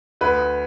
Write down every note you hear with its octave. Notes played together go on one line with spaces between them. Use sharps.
D2 B4